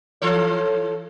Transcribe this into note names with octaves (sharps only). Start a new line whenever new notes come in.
E3 A4 C#5